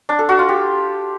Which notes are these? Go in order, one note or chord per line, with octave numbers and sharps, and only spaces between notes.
D4
A4
F#4
F4
G4